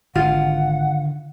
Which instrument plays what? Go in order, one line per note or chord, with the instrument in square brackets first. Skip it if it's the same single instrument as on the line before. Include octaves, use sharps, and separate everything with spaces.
[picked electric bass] G#1 [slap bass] D3 D#3 [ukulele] F4 [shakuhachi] F#5